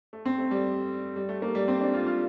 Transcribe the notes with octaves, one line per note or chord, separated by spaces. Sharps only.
A3
C4
A3
G3
G3
A3
A#3
G3
C4
D4
F4
F4